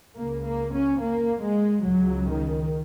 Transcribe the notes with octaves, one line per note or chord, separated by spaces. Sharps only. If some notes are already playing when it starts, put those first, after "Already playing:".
C#2 C#3 A#3
A#3
C#4
A#3
G#3
C#2 C#3 F#3
D#3